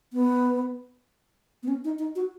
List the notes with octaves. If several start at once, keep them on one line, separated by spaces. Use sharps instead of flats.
B3
B3
C#4
D#4
D#4
F#4